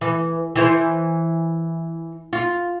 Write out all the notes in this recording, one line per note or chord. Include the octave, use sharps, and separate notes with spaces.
E3
E3 E4 C5
F4